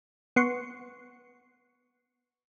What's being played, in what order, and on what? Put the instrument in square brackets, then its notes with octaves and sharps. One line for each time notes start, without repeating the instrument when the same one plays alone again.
[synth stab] B3 F#5 C6 C#6